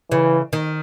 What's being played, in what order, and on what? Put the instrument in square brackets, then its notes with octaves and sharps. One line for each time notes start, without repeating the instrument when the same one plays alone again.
[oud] C#3 [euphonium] E3
[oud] D#3